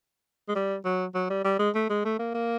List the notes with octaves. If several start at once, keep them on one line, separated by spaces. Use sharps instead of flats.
G#3
G3
F#3
F#3
G3
G3
G#3
A3
G#3
A3
A#3
A#3